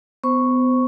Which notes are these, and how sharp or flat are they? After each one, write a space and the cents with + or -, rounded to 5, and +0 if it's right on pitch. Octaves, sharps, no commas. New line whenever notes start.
B3 +35 C5 +0 C#6 +0